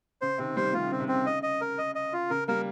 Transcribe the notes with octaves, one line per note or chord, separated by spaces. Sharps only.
C#3 C5
C3 D#3 C4
D#3 G3 C5
D#3 G3 F4
C#3
C4
C3
C4
C#3
D#5
D#5
A#4
D#5
D#5
F4
C#3 A#4
G3 A#3 A#4